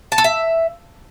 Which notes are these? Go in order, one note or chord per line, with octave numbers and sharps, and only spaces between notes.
A5
A4
E5